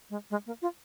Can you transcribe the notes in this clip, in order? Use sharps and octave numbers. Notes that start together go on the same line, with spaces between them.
G#3
G#3
A#3
F4